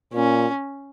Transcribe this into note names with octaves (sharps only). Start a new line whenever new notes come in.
A#2 C#4